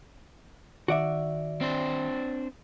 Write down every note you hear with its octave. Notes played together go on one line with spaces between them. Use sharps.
D#3 F#4 D5 E5
C4 D4 C5